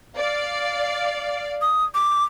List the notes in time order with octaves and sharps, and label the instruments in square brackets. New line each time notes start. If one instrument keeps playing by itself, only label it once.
[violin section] D5 F5
[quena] D#6
D6